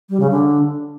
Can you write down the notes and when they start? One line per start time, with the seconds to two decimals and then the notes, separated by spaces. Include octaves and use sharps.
0.10 G3
0.20 C#3
0.30 D3